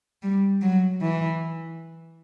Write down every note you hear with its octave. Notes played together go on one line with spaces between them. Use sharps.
G3
F#3
E3